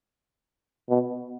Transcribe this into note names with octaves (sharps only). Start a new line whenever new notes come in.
B2